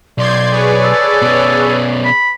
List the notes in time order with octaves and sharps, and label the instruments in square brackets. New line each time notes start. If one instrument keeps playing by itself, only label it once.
[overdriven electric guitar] B1 [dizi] D5 [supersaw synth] C6 G6 G#6
[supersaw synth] G#4 B4 C#5
[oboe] A4
[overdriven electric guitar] B2 C#4
[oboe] B5